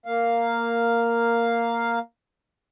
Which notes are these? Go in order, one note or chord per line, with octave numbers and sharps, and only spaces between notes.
A#3 F5